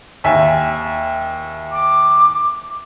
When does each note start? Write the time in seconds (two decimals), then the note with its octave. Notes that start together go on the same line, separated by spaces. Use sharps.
0.24 D#2 E5 G#5
1.72 D6